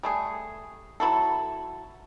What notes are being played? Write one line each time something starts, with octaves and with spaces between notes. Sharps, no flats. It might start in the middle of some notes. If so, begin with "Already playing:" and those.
G3 A3 G#4
F#3 E4 F#4 A4